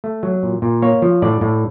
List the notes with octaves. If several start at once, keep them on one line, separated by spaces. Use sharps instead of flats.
A3
F#3
A#2
A#2
A#3 C#5
F3
A2 D5
A2